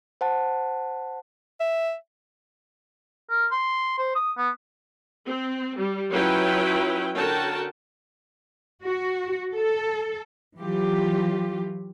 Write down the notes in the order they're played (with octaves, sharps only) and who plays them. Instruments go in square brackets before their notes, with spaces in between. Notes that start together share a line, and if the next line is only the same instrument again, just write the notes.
[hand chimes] C5 F#5 A5
[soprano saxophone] E5
[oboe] A#4
C6
C5
D#6
B3
[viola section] C4
G3
F#3 C#4 E4 F4 B4 G5
D3 C#4 F#4 A#4 G5 A5
[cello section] F#4
A4
E3 F#3 F4 G4